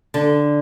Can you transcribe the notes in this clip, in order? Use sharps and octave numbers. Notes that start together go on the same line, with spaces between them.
D3